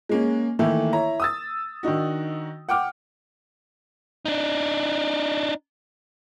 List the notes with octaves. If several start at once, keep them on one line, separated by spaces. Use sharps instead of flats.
G#3 A#3 C#4
D#3 E3 A3 A#3 E4 A4
E4 C#5 A#5
D#6 E6 A6
D#3 D4 D#4 F#4
F#5 G5 D6 F6
D4 D#4